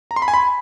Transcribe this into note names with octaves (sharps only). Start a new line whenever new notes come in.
A#5
C6
B5
G#5
B5